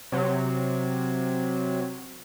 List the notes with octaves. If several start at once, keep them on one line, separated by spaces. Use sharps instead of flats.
C3 F#3